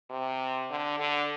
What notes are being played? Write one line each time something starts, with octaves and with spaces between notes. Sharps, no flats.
C3
D3
D3